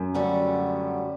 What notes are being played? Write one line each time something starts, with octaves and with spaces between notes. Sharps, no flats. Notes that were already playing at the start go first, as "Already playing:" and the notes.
Already playing: F#2
D2 D3 G3 C#4